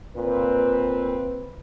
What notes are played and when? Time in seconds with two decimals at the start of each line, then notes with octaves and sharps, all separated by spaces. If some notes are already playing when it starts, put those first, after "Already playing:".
0.17 A#2 C4 B4